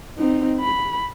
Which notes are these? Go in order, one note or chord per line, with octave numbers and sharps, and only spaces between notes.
C4 D#4
B5